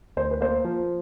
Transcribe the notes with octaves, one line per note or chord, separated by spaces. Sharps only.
D2 C5
B4
A#3 C5
F3